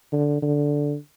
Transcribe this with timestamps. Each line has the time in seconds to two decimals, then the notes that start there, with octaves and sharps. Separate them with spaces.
0.12 D3
0.42 D3